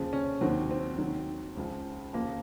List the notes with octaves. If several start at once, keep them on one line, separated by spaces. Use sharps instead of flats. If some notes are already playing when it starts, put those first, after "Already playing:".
Already playing: D#2 C#3 F3
C#4
D#2 D#3 F#3 C4
C4
D#2 D#3 F#3
C#2 C#3 F3
D#2 C#3 F3 A#3